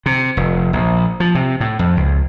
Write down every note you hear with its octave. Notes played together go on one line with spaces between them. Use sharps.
C3
F1
A#1
F3
C3
A2
F2
C#2